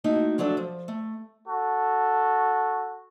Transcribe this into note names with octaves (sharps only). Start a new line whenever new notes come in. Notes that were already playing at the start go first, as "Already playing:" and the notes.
A3 A#3 D#4 E4 F#4
F3 F#3 A3 D4 A4 E5
F3
A3
F#4 A4